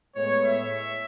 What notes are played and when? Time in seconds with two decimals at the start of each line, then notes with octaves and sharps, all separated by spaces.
0.15 A2 G#3 B3 C#5
0.44 E5